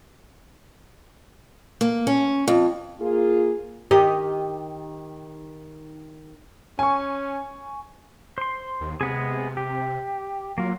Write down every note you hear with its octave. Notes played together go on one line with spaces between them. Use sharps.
A#3
C#4
F2
A#3 F4 G#4
D#3 G4 D#5
C#4 G#5 C#6
C5 C6
D#2
C3 G#3 B3 G#4
G4
F#3 A#3 F4